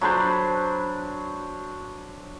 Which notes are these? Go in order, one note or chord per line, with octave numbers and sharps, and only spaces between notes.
F#3 D4 B4 C5